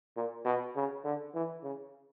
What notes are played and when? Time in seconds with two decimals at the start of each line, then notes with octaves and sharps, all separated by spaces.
0.17 A#2
0.45 B2
0.76 C#3
1.04 D3
1.34 E3
1.63 C#3